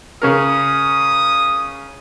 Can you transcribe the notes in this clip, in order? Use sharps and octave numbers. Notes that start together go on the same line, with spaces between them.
C#3 C#4 A#4 D#6